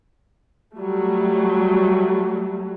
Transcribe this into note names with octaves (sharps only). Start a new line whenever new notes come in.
F#3 G3 A3